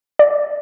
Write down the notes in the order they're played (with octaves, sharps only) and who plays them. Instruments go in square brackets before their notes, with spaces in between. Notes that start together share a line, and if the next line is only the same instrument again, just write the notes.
[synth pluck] D5